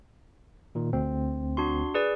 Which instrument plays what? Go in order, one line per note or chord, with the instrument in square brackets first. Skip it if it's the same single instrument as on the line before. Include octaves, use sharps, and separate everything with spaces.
[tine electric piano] A#2 D#3
D2 C4
[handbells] D4 F#4 C6
G#4 B4 D5